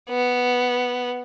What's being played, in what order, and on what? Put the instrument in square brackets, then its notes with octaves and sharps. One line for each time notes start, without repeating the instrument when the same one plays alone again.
[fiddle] B3